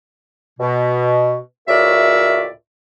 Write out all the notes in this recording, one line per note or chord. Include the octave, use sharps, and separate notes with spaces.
B2
C#2 A2 F#4 A#4 D5 E5